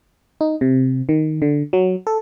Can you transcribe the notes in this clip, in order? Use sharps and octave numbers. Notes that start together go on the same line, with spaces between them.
D#4
C3
D#3
D3
F#3
A4